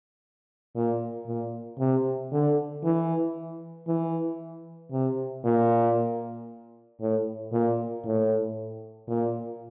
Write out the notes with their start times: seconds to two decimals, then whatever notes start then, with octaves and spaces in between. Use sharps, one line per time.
0.76 A#2
1.27 A#2
1.79 C3
2.32 D3
2.84 E3
3.88 E3
4.92 C3
5.45 A#2
7.00 A2
7.52 A#2
8.04 A2
9.08 A#2